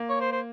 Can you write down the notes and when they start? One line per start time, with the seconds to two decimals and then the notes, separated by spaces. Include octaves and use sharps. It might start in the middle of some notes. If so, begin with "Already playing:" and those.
Already playing: A#3
0.09 C#5
0.20 C5
0.32 C5